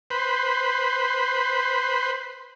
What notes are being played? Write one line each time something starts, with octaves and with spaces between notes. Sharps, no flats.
B4 C5